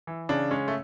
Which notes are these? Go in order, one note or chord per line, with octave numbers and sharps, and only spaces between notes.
E3
C#3 D4
G#3 C#4
A3